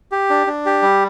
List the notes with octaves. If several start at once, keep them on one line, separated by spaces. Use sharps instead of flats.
G4
D4
D4
G4
G3